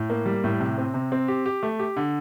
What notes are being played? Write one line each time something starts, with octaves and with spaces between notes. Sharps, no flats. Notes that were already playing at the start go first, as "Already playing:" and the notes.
Already playing: A2
A#3
G3
A2
C3
C4
C3
C4
G4
G4
A3
G4
D3